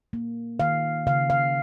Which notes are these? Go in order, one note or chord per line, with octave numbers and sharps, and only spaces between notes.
A#3
D#3 F5
C#3 F5
F5